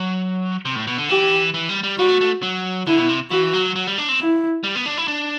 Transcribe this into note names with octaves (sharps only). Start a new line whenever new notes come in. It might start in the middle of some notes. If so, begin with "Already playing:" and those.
Already playing: F#3
C3
A2
B2
D3
E3 G4
E3
G3
G3
G3 F#4
A3
A3
F#3
D3 E4
B2
C3
E3 F#4
F#3
F#3
G3
D4
C4
E4
G3
B3
D4
E4
D4